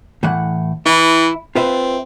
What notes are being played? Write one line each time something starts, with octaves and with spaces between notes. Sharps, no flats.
A2 E3 F#5
E3 E4
C4 F4 B4 E5